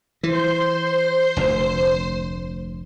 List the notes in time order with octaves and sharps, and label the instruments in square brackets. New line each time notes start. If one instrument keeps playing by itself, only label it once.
[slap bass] E3 [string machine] C5 C6
[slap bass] F1 D2